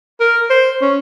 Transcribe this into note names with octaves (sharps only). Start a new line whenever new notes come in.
A#4
C5
C#4